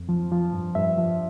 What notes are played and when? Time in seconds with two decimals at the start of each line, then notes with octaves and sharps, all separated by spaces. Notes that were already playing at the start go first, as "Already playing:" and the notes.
Already playing: F2
0.09 F3
0.31 F3
0.53 G2
0.75 G2 E5
0.98 F3